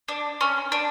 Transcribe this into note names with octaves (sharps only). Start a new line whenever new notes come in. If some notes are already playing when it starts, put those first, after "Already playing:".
D4
C#4
D4